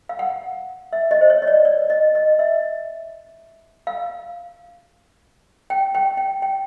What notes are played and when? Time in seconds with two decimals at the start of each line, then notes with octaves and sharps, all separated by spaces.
0.09 F5
0.19 F#5
0.93 E5
1.11 D#5
1.21 C5
1.30 C#5
1.42 D#5
1.47 D5
1.65 D5
1.90 D#5
2.15 D#5
2.39 E5
3.87 F5
5.70 G5
5.95 G5
6.17 G5
6.42 G5